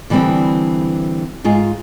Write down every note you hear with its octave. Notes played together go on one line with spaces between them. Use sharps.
D3 E3 G3 B3 C4
G#2 F4 G#4